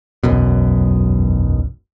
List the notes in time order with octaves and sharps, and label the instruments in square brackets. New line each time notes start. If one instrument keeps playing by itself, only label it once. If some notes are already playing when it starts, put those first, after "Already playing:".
[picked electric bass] E1 B1 F#2 B2